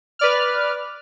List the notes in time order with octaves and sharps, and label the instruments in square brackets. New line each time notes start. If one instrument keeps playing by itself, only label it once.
[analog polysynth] B4 D5 F6